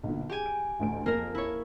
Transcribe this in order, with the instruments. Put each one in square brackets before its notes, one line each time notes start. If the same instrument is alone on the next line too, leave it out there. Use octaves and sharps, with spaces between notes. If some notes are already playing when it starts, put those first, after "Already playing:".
[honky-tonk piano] B1 A#2 D3
[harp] G4 G#5 [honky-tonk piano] G#4
[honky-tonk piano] D7
A1 D2 D7
[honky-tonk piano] F2 [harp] A#3 A#4
[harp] E4 C#5